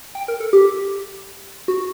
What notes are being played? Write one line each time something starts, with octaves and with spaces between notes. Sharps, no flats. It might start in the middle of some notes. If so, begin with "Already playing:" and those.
G5
A#4
A4
G4
F#4